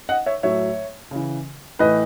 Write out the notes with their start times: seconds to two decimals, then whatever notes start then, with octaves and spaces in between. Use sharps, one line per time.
0.09 D#5 F#5
0.26 C#5 E5
0.43 A2 F#3 C#5 E5
1.11 C#3 E3
1.79 A2 E3 B4 D#5